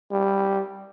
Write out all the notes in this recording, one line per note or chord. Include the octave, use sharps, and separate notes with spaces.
G3